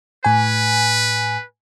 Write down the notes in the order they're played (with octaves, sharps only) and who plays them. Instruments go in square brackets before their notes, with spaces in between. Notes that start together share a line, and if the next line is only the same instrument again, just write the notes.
[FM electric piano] A2 G#5 [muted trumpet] B4